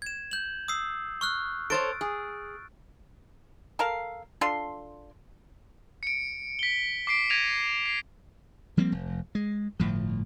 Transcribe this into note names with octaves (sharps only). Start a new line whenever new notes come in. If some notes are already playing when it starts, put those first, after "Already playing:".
G#6 E7
G6 F#7
D#6 E6 C7
C#6 F6 F#6
A4 C5 C#5 A6 D7
G#4
A4 A#4 F5
D4 F4 A4 C6
C#7 D7
B6 G7
D6 C7 D7
G#6 A#6 B6 D7 D#7 F7
C7
F3 G3 A#3 C4
F1
G#3
G1 A2 F3